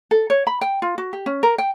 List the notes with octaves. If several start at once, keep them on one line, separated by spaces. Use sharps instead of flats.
A4
C#5
B5
G5
F4
F#4
G4
C#4
A#4
G5